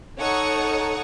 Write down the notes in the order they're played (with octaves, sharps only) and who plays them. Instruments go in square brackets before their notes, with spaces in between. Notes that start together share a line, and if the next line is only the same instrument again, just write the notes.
[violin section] D#4 A4 C#5 F#5 C#6 D#6